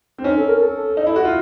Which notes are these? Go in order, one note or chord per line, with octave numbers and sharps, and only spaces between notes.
C4
C#4 D#4
A4
A#4
A4
D#4
E4
F#4
F4